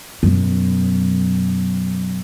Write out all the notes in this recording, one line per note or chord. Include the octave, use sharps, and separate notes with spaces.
F#2 B2